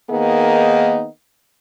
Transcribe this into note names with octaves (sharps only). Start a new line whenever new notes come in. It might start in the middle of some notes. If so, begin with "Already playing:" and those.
D#3 A#3 B3 D#4 G#4 A#4